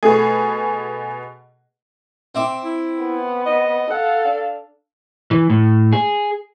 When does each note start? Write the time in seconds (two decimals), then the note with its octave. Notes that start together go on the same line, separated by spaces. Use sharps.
0.03 B2 A3 G#4
2.35 C4 E5 D6
2.64 E4
3.02 B3
3.46 D#5
3.90 A4 F5 F#5
4.25 D4
5.31 E3
5.50 A2
5.93 G#4